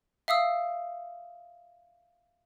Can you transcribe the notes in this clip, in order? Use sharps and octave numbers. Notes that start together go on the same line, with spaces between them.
E5 F5 D#6 E6